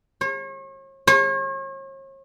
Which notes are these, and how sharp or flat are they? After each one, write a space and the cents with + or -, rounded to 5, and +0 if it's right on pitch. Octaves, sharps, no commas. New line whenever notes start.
C#5 -40
C#5 -40